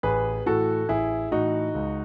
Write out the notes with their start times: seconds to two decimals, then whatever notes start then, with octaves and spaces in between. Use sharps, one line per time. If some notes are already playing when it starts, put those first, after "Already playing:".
0.03 A1 G#4 B4
0.46 A2 E3 F#4 A4
0.89 A1 E4 G#4
1.31 A2 E3 D#4 F#4
1.74 C#2